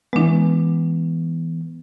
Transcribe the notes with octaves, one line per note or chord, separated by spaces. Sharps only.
E3 G#3 B3 D4